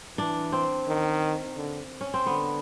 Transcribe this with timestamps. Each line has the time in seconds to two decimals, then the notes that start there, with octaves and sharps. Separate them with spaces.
0.18 E3 D4
0.52 C4
0.88 D#3
1.57 D3
2.01 C#4
2.14 C4
2.26 D3 B3